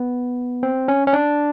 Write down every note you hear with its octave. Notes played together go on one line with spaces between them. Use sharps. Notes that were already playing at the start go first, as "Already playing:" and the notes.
Already playing: B3
C4
C#4
C#4
D4